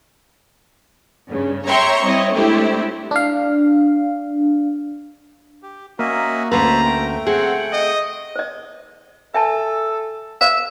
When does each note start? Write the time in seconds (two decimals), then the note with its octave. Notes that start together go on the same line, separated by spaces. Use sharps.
1.27 G2 C#3
1.67 C#5 E5 G5 A#5 C6 C#6
2.05 G3 C4 E4 C#5 D#5
2.35 G#3 A3 C4 D4 E4 G4
3.11 D4 F5
5.63 G4
5.99 A#3 C#4 F#4 D#5 E5
6.52 D2 C#4 B4 C5 E5 A5 A#5
6.85 A3 G5
7.27 C4 G#4 F#5
7.73 D#5
8.36 C5 D#5
9.34 A4 E5 G#5 A5
10.41 C5 E5 F5